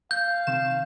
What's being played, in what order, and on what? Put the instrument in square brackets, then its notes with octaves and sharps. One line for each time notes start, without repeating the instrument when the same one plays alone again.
[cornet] F5 [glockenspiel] G6
[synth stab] C3 D#3 E7